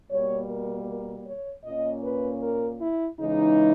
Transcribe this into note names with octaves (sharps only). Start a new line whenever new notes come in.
B2 G3 A#3 C#5
A#4
A#4
C#5
A#2 A#3 C#4 D#5
B4
A#4
E4
C#3 E3 G#3 D#4